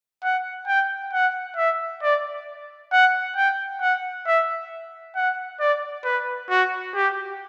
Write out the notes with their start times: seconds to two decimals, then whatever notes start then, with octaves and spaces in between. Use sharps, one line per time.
0.24 F#5
0.68 G5
1.13 F#5
1.57 E5
2.03 D5
2.92 F#5
3.37 G5
3.81 F#5
4.27 E5
5.16 F#5
5.60 D5
6.05 B4
6.50 F#4
6.95 G4